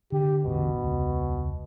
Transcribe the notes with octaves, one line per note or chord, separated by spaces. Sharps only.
D3 G4
E1 A1 B2 D3
E1 C#2